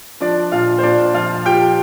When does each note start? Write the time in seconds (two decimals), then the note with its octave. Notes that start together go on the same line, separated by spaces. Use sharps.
0.20 F3 D4 D5
0.52 A#2 F4 F5
0.78 C5
0.83 A#2 D4 D5
1.14 F3 F4 F5
1.45 F3 G4 G5